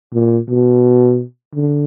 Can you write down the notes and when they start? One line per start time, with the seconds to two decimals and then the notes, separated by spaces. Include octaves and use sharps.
0.14 A#2
0.48 B2
1.55 D3